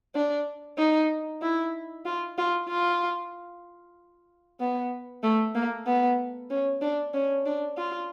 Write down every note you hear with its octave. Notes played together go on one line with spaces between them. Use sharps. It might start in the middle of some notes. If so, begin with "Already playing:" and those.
D4
D#4
E4
F4
F4
F4
B3
A3
A#3
B3
C#4
D4
C#4
D4
F4